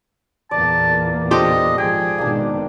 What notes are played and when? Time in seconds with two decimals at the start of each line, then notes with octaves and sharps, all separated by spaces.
0.51 E2 A#2 A#3 D5 A5
1.31 D4 F4 G4 A4 C5 D#5
1.78 G#1 F3 G#4 G5
2.18 G#1 B2 D#3 A#3 D4